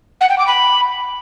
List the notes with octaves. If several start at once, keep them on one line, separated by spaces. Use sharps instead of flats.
F#5
G5
D6
B5